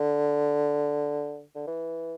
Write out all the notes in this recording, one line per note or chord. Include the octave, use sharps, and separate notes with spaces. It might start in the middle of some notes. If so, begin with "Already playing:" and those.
Already playing: D3
D3
E3